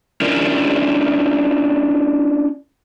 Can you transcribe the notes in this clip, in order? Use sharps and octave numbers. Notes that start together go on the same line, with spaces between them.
C#4 D4 E4 F4 A#4